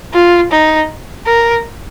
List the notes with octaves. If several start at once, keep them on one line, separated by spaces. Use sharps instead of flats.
F4
D#4
A#4